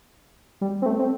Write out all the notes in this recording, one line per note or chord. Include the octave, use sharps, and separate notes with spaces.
G3
C4
A3
C4